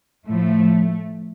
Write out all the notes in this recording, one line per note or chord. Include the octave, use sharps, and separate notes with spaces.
A2 F3 A3